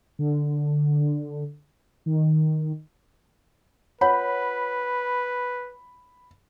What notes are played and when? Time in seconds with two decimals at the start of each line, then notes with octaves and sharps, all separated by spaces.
0.19 D3
2.06 D#3
4.01 F4 B4 C#5 F#5 B5